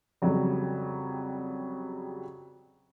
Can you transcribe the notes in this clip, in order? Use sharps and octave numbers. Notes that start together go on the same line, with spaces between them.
F2 C#3 F#3 G3